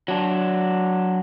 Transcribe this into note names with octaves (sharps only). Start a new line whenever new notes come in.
F#3 D4